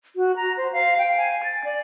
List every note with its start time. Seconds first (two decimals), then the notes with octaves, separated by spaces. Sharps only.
0.16 F#4
0.36 A#5
0.57 C5
0.73 F5
0.99 G5
1.17 G#5
1.44 A6
1.64 D5